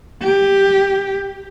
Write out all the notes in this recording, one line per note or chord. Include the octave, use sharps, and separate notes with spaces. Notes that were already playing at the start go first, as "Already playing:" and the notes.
G4